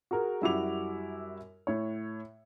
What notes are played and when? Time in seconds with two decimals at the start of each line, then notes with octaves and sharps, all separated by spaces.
0.11 F#4 G#4 A#4
0.42 F#2 G3 E4 F#4 D6 F7
1.67 A2 C#5